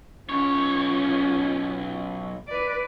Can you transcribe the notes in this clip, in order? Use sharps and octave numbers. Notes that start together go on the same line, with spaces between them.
B1 C#4 F4 C#5
B4 D5